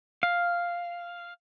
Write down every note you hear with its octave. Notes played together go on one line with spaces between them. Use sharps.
F5